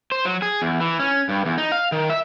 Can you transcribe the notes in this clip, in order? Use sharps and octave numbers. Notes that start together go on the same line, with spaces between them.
C5
F#3
G#4
E2
E3
C#4
G2
E2
D#4
F5
D#3
E5